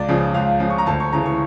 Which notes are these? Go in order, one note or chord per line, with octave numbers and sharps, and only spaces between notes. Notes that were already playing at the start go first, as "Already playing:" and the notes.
Already playing: C#2 D5
C#3 F3
C#2 F5
C#3 F3
C#6
A#5
D2 A5
C#6
C#3 E3 A#5
C#6